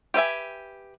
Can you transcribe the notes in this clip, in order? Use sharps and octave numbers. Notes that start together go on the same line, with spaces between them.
G4 B4 E5 G#5